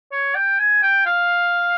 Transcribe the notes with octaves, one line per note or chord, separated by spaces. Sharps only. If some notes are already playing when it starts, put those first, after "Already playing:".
C#5
G5
G#5
G5
F5